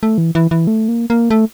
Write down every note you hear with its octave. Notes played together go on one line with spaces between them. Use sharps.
A3
E3
E3
E3
A3
A#3
A#3
A3